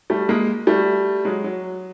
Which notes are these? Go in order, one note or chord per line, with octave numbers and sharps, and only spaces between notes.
G3 A3
G#3 A#3
G3 A3
F#3 G#3
F#3